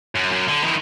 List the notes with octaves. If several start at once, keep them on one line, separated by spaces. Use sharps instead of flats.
F#2
F#2
D3
D#3 E4